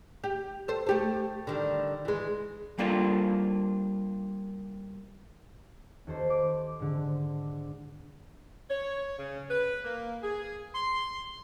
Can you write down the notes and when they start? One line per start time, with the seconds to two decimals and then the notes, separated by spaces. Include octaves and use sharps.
0.24 G4
0.68 A4 C5
0.86 A3 G4 A4
1.47 D3 D#3 G3
2.05 E3 G#3
2.78 G3 A#3 D4 F4 A4 C5
6.07 D#2 A4 C5
6.30 D6
6.80 G#2 D3
8.70 C#5
9.19 C#3
9.50 B4
9.85 A#3
10.23 G#4
10.75 C6